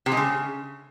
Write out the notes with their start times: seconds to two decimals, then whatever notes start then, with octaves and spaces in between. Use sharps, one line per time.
0.06 C3
0.12 G#3
0.17 C#3